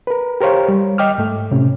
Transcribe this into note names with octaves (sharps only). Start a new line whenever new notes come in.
A#4 B4
G4 A#4 C5 C#5 F5
G3
D#5 G5 D6 F6
G#2 A3
A2 C3 C#4